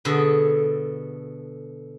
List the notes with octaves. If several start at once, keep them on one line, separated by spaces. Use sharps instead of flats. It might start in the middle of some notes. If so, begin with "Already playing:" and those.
B2 D3 G#4 A4